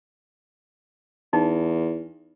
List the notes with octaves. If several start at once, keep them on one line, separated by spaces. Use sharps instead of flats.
E2 D#4